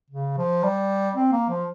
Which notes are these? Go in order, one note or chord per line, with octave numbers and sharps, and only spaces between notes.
C#3
F3
G3
C4
A#3
F3